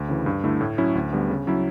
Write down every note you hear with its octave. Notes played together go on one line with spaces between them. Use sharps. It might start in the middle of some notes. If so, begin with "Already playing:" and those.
Already playing: D2
C#3 E3
G2
D3 A3 E4
A2
F#3 C#4 E4
D2
D3 G3 B3
C#3
F#3 C#4 E4